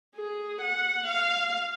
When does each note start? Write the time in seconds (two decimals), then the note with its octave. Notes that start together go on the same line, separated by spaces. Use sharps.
0.16 G#4
0.61 F#5
1.06 F5